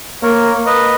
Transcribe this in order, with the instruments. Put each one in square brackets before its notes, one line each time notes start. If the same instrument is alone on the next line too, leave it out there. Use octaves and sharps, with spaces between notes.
[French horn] A#3 [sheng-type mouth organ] A#4 C#5
[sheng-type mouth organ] B4 D#5